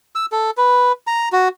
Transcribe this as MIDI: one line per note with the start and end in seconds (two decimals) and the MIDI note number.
0.15 0.26 88
0.32 0.51 69
0.57 0.92 71
1.07 1.29 82
1.32 1.48 66